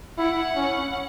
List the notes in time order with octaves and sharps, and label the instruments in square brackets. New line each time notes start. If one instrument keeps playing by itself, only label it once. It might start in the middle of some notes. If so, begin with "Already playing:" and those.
[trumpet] E4 [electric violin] F#5
[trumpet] C#4